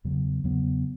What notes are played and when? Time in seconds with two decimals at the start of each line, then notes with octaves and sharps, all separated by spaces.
0.04 E2 C#3 F#3 B3
0.44 E2 C#3 F#3 B3